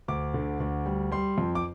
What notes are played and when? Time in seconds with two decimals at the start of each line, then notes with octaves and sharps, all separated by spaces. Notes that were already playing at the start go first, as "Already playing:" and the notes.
0.08 D2 D6
0.34 D3
0.60 D2
0.86 G3
1.12 G3 C6
1.38 F2
1.55 D6